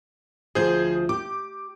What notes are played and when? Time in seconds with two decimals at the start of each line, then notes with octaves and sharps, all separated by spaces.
0.55 D2 F3 G#4 C5 G6
1.09 G4 D6